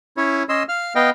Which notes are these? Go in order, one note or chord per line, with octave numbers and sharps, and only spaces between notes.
C#4 E4 C#5
C#4 D#5 C6 E6
F5 F6
B3 D#5 F5 G5